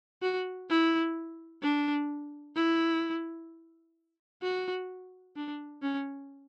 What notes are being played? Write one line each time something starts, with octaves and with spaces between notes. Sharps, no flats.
F#4
E4
D4
E4
F#4
D4
C#4